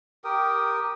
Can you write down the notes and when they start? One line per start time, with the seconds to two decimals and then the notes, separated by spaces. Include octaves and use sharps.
0.24 G4 A#4 G5 D#6